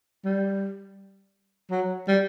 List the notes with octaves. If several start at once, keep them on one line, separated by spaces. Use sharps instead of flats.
G3
F#3
G3